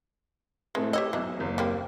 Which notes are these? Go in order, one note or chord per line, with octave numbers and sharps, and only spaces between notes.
A2 G#3 A3 C4
G4 C#5 D#5 E6
B1 E3 G#3
F#1 D#2
G3 A#3 C4